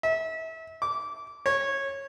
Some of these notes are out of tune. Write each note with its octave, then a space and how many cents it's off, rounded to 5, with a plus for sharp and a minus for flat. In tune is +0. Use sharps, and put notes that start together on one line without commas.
E5 -30
D6 -20
C#5 -15